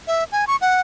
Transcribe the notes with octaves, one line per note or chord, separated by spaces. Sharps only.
E5
G#5
C#6
F#5